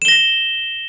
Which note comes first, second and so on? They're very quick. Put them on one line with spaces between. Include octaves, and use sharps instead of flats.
E7 G7 A#6